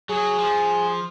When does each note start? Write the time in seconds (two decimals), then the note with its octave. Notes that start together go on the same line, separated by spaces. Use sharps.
0.09 F#3 G#4
0.39 F3